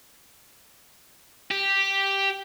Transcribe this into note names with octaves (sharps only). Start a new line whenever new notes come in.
G4